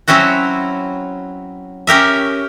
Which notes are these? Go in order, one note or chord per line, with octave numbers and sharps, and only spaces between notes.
F#3 C4 C#4 E4 F#4
C#4 G4 A#4 E5